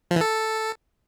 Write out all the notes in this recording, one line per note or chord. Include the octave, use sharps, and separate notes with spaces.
F3
E3
A4